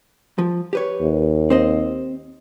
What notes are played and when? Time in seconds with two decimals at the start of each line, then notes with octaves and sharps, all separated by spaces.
0.38 F3
0.73 G4 B4 C#5
1.01 D#2
1.50 C4 C5 D#5